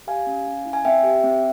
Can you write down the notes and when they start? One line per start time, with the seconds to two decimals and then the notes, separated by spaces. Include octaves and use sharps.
0.07 G4 F5 G#5
0.27 C#4
0.47 C#4
0.65 E4
0.73 G#5
0.85 C4 E5 G5
1.03 G4
1.24 C4